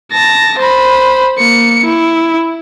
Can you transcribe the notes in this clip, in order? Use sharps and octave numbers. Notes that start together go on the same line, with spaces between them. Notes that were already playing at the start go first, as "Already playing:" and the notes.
A5 A#6
C5 B5
A#3 C#7
E4